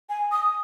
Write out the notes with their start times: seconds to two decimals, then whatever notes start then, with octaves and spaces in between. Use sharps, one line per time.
0.09 G#5
0.32 D#6